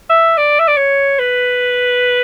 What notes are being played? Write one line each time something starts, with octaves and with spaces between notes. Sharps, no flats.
E5
D5
E5
D5
C#5
B4